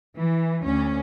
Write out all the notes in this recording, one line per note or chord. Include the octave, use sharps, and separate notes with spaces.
E3
D2 C#4